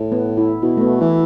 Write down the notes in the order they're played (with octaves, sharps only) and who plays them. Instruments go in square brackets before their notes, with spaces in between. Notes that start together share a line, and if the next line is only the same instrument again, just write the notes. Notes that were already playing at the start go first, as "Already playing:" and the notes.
Already playing: [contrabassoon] A2
[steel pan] B3
E4
[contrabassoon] B2 [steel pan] E4
[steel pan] A3
B3
[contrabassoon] E3 [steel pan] E4